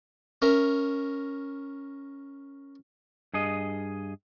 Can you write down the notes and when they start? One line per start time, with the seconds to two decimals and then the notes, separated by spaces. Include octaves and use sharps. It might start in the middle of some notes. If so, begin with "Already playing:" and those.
0.42 C#4 A#4 E5
3.34 G2 G#4 D#5